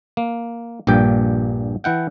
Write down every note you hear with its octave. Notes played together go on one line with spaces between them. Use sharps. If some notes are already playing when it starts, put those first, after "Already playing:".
A#3
A#1 G2 A#2 G4 G5
E3 E4 F#5 G5